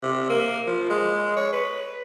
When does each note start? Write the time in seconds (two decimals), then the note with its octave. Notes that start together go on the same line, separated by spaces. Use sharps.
0.03 C3
0.29 A#3
0.67 F3
0.90 G#3
1.37 C#5
1.53 B4